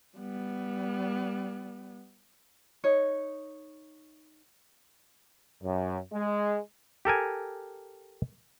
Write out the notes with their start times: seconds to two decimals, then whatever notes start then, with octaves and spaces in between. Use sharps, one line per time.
0.18 G3 B3
2.84 D#4 C#5
5.63 F#2
6.13 G#3
7.05 G4 A4 A#4 G#5